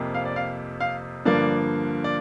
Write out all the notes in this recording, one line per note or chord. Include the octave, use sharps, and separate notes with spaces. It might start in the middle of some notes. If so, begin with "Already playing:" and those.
Already playing: F2 C3 A#3
F5
D5
F5
F5
G2 D3 F3 A#3 D5
D5